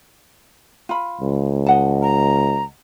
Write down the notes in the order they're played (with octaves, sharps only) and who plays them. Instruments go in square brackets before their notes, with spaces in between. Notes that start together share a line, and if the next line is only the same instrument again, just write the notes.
[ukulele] F4 B5
[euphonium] C#2
[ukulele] D#5 F#5 A5
[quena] A#5